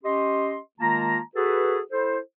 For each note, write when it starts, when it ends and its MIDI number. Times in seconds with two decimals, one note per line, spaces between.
0.04 0.58 61
0.04 0.58 67
0.04 0.58 75
0.04 0.58 84
0.80 1.19 51
0.80 1.19 56
0.80 1.19 58
0.80 1.19 65
0.80 1.19 81
0.80 1.19 82
1.36 1.80 66
1.36 1.80 68
1.36 1.80 69
1.36 1.80 71
1.92 2.18 64
1.92 2.18 69
1.92 2.18 72